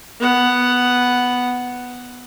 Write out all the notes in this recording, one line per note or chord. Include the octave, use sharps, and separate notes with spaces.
B3 F#5